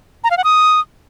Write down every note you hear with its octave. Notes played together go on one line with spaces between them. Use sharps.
A#5
F5
F#5
D#6